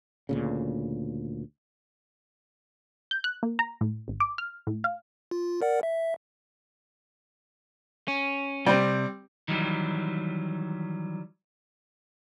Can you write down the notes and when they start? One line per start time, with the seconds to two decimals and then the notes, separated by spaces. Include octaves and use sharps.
0.29 D2 A#2 C#3
3.11 G6
3.24 F#6
3.43 A#3
3.59 A#5
3.81 A2
4.08 G#1
4.20 D6
4.38 F6
4.67 A2
4.84 F5
5.31 F4
5.62 A#4 D5 F#5
5.83 E5
8.08 C#4
8.67 C3 G3 C4
9.48 D#3 E3 F#3 G3